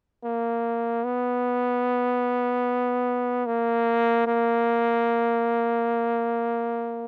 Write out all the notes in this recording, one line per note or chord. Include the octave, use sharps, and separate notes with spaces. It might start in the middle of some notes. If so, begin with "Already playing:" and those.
A#3
B3
A#3
A#3